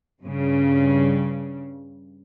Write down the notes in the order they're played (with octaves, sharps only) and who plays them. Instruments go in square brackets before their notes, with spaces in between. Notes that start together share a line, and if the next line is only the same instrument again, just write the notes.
[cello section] G2 C#3